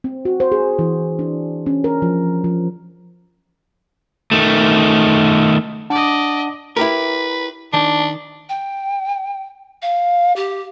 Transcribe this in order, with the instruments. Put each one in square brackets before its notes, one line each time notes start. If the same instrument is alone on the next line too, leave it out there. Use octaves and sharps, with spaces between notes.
[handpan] C4
F#4
C5
G#4
E3
D4
C#4
A#4
F3
F3
[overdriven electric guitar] D#3 A3
[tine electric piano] D4 F#5 A5 [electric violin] D5 D#5
[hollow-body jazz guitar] E4 G4 A#4 [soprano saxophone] B4
[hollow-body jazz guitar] D#3 [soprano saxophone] D4
[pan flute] G5
F5
G4